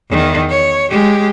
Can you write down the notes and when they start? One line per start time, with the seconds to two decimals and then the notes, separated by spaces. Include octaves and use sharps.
0.10 E2 D#3
0.50 C#5
0.90 G#3 G4